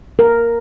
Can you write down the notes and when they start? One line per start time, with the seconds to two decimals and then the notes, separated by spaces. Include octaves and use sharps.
0.19 A#4